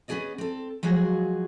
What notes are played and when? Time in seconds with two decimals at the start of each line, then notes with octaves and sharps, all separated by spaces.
0.08 B3 C#4 F#4 G#4 D5 D#5
0.38 C4 A4
0.83 F3 F#3 G#3 F#4 G#4